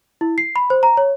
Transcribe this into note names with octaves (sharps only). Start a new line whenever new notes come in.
E4
C7
B5
C5
A#5
C#5